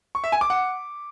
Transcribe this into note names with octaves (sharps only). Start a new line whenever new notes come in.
C#6
E5
G#5
D6
F#5